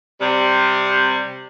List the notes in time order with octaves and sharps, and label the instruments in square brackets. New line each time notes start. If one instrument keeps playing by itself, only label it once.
[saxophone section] C3 G3